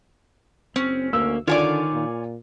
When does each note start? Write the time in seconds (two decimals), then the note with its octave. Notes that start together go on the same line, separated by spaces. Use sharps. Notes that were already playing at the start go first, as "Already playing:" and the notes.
0.76 F#1 C4 C#4
1.13 D2 A#3 E6
1.48 D3 D#3 F4 C#5 D5 G#5 D6
1.93 A#2